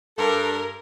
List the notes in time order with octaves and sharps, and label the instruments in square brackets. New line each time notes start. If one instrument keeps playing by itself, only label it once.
[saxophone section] G2 A4 [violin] A#4